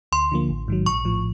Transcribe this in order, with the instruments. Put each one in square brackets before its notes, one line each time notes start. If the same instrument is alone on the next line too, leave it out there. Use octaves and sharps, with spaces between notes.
[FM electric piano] D2 [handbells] C6
[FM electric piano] D3 F3 A#3
A1
G#2 D#3 F#3
[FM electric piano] A#1 [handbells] C#6
[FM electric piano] A2 F3